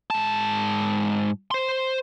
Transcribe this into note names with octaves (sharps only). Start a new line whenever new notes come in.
G#2 A5
C5 C6